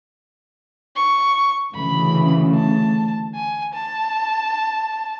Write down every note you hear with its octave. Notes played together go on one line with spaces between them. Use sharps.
C#6
D2 C#3 E3 A3 B5
A5
G#5
A5